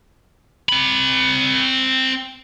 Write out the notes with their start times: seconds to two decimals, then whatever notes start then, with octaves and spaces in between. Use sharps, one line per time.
0.69 C4 B5